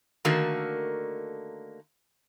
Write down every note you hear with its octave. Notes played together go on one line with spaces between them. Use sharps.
D3 D#3 A3 A#3 F#4 A#4